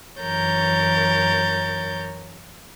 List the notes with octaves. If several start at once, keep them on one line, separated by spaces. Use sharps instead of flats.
F#2 E3 A#4 C#5 G6 A6